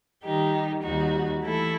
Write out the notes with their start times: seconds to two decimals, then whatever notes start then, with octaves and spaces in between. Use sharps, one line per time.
0.24 D#3 G3 D#4 G4
0.83 D#2 D#3 G3 D#4 F#4
1.42 E3 A3 E4 A4